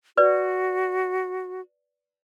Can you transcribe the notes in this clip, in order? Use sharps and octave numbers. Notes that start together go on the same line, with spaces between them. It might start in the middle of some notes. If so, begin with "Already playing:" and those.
F#4 B4 D5